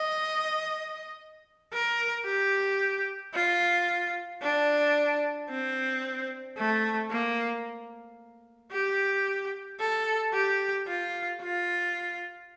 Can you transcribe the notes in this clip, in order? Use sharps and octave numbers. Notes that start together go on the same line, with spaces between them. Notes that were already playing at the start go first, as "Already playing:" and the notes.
Already playing: D#5
A#4
G4
F4
D4
C4
A3
A#3
G4
A4
G4
F4
F4